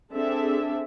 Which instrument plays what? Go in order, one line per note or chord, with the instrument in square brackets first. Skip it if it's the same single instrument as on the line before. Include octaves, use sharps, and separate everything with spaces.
[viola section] C4 D4 G#4 A4 E5